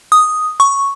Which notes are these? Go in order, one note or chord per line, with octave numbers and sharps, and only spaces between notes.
D#6
C#6